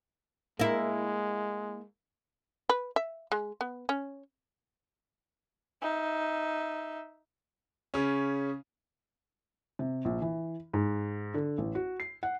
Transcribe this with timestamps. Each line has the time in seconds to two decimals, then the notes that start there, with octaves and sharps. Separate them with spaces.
0.59 G#3 A#3 E4
2.69 B4
2.96 E5
3.32 G#3
3.61 B3
3.89 C#4
5.82 D#4 E5
7.94 C#3 C#4
9.79 C3
10.05 A#1
10.22 E3
10.73 G#2
11.34 D3
11.58 A1
11.75 F#4
12.00 C7
12.23 F#5